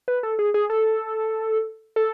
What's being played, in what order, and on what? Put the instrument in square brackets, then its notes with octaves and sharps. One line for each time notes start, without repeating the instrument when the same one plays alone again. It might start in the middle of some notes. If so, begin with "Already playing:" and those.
[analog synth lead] B4
A4
G#4
G#4
A4
A4